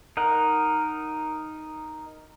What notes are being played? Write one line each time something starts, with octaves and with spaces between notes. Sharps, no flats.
D#4 A#4 F#5